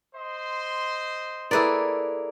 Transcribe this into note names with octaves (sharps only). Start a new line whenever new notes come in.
C5 D#5 C6
A#3 E4 G#4 A4 B4 D5